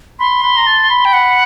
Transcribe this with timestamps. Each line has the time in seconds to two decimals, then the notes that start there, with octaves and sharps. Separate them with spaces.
0.19 B5 C6
0.43 B5
0.57 A#5
0.67 A5
0.90 B5
1.05 G5
1.13 F#5